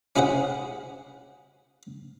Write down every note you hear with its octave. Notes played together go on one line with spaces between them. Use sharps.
C#4 E4 G#4 C5 F#5